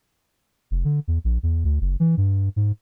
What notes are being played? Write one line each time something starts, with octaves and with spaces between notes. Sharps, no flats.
F1
D3
E2
A#1
E2
D2
F#1
E3
G2
G#2